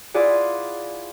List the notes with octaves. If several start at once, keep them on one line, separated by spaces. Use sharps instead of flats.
E4 F4 G#4 D5 F#5